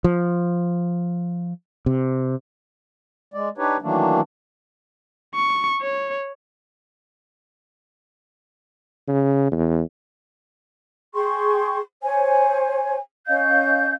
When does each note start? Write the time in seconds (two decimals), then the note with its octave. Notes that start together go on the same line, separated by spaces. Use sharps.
0.04 F3
1.86 C3
3.34 G#3 D5
3.58 D4 D#4 G4 B4 C#5
3.82 D#3 E3 F#3 A3 A#3 D4
5.35 C#6
5.81 C#5
9.08 C#3
9.52 E2
11.14 G#4 G5 C6 C#6
12.02 C5 C#5 G#5
13.27 C#4 D#5 F5 G6